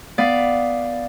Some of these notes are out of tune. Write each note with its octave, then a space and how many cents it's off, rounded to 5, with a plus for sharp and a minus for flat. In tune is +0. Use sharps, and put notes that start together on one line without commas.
B3 +10 D5 +0 F5 +0